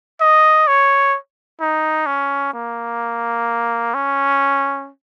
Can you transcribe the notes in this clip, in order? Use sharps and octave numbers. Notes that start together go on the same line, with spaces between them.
D#5
C#5
D#4
C#4
A#3
C#4